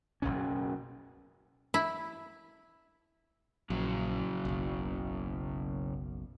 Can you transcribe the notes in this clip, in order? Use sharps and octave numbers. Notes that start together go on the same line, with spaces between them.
F#1 C2 B2 C#4
E4
A#1 C#3 F#3
F#1 B1